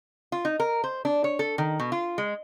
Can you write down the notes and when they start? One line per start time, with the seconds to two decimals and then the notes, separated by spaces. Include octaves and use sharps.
0.32 F4
0.45 D#4
0.60 A#4
0.84 C5
1.05 D4
1.24 C#5
1.39 A4
1.58 D#3
1.80 B2
1.92 F4
2.18 G#3